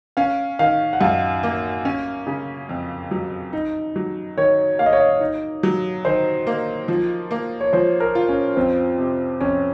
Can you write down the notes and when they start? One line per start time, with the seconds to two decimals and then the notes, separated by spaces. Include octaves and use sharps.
0.17 C#4 F5
0.59 D#3 F5
0.93 F#5
1.01 F#2 F5
1.43 A#3
1.85 C#4
2.27 C#3
2.69 F2
3.11 F#3
3.53 D#4
3.96 F#3
4.37 D#3 C#5
4.79 A#3 F5
4.86 D#5
4.93 C#5
5.00 D#5
5.20 D#4
5.63 F#3
6.05 D#3 C5
6.47 A#3
6.88 F3
7.31 A#3
7.61 C#5
7.73 F3 C5
8.00 A#4
8.15 F4
8.28 C#4
8.56 F2 C4
8.98 C3
9.40 F2 C#4